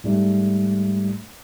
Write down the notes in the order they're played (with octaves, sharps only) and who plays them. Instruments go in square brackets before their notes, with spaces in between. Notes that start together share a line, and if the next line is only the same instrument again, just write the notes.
[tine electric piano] G#2 G3 A3